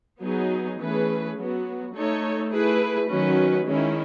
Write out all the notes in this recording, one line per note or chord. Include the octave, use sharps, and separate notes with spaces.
F#3 B3 D#4 G#4
E3 A3 C#4 G#4 B4
F#3 B3 F#4
A3 D#4 A4 C#5
A3 E4 G#4 B4
D#3 F#3 C#4 F#4 B4
D#3 G#3 C#4 E4